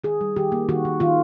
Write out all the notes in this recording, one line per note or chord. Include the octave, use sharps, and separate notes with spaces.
D#3 G#4
G3
D#3 G4
A#3
D#3 F#4
D#3
D#3 F4